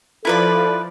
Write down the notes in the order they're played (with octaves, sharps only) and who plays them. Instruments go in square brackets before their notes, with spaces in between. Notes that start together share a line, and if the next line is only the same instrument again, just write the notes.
[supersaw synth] F3 D5 [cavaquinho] E4 B4 B5 [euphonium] A4